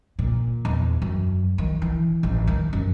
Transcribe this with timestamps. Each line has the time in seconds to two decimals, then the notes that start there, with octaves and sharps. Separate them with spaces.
0.19 A#2
0.65 E2
1.02 F#2
1.58 D#3
1.82 E3
2.23 A1
2.47 D#3
2.73 F#2